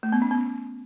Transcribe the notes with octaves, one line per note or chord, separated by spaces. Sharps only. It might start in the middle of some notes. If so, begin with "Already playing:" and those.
A3
B3
C#4
B3